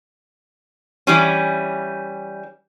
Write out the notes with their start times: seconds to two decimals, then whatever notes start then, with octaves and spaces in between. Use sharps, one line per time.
1.07 E3 G3 C#4